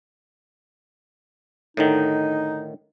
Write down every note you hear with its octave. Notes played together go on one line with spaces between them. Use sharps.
A2 D3 D#3 D#4